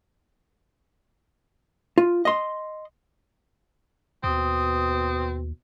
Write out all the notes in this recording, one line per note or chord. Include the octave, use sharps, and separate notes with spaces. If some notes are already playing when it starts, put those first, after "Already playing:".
F4
D#5 C6
D#2 B2 C4 D#6